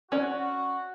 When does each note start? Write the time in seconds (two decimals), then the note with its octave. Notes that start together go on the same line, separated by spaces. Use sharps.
0.12 C#4 F#4 D5